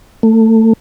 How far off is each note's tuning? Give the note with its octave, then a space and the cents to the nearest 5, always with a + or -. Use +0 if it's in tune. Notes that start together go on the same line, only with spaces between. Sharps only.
A3 +25